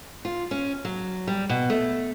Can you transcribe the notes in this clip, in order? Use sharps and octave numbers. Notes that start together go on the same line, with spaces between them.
F4
C#4
F#3
G3
B2
A3